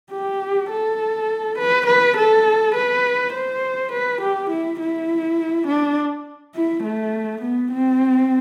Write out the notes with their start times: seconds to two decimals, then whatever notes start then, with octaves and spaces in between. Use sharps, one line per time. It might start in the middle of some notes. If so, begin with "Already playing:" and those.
0.11 G4
0.70 A4
1.58 B4
1.86 B4
2.17 A4
2.75 B4
3.33 C5
3.92 B4
4.21 G4
4.50 E4
4.80 E4
5.67 D4
6.55 E4
6.84 A3
7.42 B3
7.71 C4